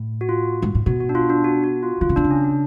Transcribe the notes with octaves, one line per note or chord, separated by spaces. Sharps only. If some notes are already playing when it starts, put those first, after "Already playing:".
Already playing: A2
F#4
F4
G#2
A2
B2 F#4
F#4
D4
F4
D4
F#4
F#4
F4
D3 F4
C#3
B2 D4
C#3
C#4
D4